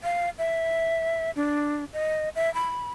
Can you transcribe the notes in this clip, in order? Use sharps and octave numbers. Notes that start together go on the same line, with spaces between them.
F5
E5
D4
D#5
E5
B5